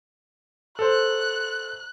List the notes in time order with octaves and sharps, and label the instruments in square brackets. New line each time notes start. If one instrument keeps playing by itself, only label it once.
[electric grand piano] A4 C5 [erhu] F#6